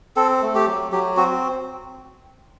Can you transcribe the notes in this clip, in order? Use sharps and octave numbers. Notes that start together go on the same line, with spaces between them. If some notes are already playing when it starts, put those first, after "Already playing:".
C4 A4
A3
G4
F#3
F#3 G4
C4 F#4